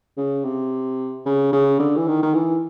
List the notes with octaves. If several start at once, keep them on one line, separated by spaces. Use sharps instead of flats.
C#3
C3
C#3
C#3
D3
E3
D#3
D#3
E3